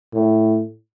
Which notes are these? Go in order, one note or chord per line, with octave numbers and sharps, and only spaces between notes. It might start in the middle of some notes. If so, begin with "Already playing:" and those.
A2